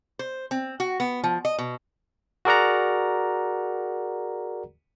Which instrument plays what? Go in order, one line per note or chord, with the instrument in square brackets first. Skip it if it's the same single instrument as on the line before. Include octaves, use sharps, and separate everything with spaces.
[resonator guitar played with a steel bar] C5
C4
F#4
B3
F3
D#5
B2
[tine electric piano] F#4 G#4 A#4 D5 F#5 A#5